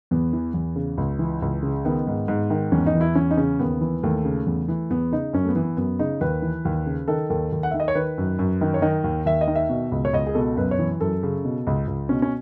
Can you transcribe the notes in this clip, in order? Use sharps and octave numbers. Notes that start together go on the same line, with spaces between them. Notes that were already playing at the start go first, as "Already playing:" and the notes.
E2 B3
E3
E2
C#3
C#2
E3
C#2
C#3
D#3 B3
G#2
G#2
D#3
E2 C#4
D#4
E3
E4
E2 C#4
D#4
C#3 C#4
D#2 B3
E3
D#2 A3
C#3
E2
E3
E2 B3
C#3 D#4
F#2 C#4
A3
B3
E3
B3
F#2 B3
C#3 D#4
D#2 B4
E3
D#2
C#3
D#3 A4
D#2 A4
D#2
F#5
D#3 E5
D#5
C#5
D#3 B4
F#2
F#2
D#3
C#5
D#3 D#5
D#2
D#2 E5
D#5
D#3
E5
B2
C#2
C#5
C#2 D#5
G#4
B2 A4
F#2 B4
C#5
E3
F#2 A4
C#3
B2
C#2
C#2
B2 C#4
C#4